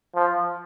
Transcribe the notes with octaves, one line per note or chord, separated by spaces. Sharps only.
F3